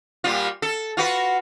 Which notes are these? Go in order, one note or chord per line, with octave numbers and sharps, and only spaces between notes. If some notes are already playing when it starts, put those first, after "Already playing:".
A#2 G3 F4
A4
F4 F#4 B4